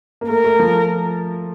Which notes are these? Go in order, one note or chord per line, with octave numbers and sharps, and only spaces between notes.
A#3
A3 A#4
A3
F3